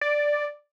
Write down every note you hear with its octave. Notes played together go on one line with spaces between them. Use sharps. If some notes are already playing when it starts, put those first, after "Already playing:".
D5